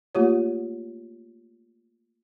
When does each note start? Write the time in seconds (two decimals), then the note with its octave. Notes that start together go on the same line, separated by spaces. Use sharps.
0.15 A3 A#3 F4 G4 C#5